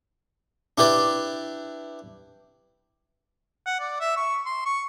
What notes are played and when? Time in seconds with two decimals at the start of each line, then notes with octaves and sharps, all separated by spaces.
0.78 D4 E4 G4 B4 D5
3.66 F#5
3.80 D5
4.00 E5
4.17 C#6
4.46 C6
4.66 C#6